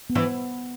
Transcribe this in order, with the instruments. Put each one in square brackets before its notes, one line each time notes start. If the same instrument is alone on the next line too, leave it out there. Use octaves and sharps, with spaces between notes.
[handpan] B3
[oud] E3